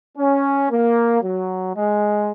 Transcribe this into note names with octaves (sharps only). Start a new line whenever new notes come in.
C#4
A#3
F#3
G#3